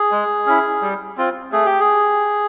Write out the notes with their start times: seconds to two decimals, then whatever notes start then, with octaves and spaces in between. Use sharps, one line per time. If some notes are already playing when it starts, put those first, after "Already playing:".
Already playing: G#4
0.12 G#3
0.46 C#4 E4
0.82 G3
1.17 C4 F4
1.52 A3 G#4
1.66 G4
1.80 G#4